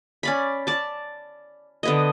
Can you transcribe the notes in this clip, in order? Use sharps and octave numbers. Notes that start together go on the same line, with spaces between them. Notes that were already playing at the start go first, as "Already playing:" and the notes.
C#4 D5 B5
D5 A5
D3 B3 D#5